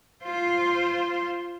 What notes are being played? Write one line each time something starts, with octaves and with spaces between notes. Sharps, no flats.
F4 C5